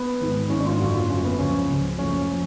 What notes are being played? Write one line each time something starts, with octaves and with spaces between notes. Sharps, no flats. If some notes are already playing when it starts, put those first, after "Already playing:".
Already playing: B3
G#1 G#2 G#3
G#1 G#2 G#3 C#4
D4
F4
F#1 F#2 D3 F#4
F4
F#1 F#2 D3 C#4
B3
C#2 C#3 F3 C#4
C#2 C#3 F3
F#1 F#2 F3 A3 C#4
F3